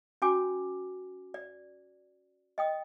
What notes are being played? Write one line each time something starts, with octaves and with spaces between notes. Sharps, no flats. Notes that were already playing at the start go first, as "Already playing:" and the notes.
C#4 F#4 G#5 D6
D5
D#5 G5 D#6